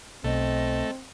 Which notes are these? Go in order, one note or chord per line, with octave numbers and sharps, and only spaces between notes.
B1 A3 C4 D#5